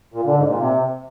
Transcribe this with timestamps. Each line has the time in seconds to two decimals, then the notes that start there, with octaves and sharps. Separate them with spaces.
0.14 A#2
0.25 D3
0.37 G#2
0.48 A#2
0.59 C3